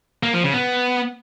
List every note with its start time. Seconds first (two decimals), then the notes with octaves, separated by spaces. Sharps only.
0.23 A#3
0.33 F3
0.43 C#3
0.53 B3